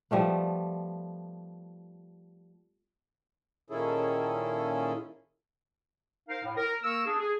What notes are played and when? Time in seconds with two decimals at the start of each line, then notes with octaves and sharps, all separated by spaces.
0.11 F3 G3 A3 B3
3.70 A#2 D#3 C#4 E4 G#4 A4
6.29 D#4 A#4 C5 F5
6.44 A2
6.57 A#4
6.83 A#3 A#4 C#6 E6
7.06 D4 G#4
7.19 G#4